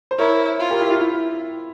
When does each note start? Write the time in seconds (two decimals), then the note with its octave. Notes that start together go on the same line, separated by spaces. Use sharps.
0.11 C5
0.19 E4 A#4 C#5
0.60 F4
0.70 G4 A#4
0.80 E4 G4
0.91 F4
1.01 E4